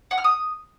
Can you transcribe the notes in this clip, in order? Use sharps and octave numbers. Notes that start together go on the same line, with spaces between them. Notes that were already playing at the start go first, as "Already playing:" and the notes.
F#5
F6
D#6